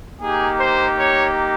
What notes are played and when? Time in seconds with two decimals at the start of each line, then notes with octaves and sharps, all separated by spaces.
0.21 A#3 D#4 G4 G#4
0.59 C5
0.98 C#5